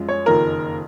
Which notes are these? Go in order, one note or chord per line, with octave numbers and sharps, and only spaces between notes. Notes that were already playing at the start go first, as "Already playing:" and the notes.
Already playing: F#2 F3 G#3
C#5
F#1 F2 D#3 A#3 A#4